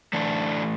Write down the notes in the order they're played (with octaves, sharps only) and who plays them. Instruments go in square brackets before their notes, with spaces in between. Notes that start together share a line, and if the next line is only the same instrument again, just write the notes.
[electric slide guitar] E3 A3 D4